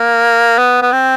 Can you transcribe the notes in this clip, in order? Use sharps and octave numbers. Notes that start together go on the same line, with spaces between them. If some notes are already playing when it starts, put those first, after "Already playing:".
Already playing: A#3
B3
B3
C4